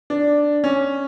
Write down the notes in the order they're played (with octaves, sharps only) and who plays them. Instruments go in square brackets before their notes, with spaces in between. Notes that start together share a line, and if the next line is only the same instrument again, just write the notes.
[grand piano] D4
C#4